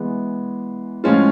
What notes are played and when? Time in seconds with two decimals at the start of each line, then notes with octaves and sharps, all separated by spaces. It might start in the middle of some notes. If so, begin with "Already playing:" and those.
Already playing: E3 G#3 B3
1.04 A2 F3 G#3 C#4 F4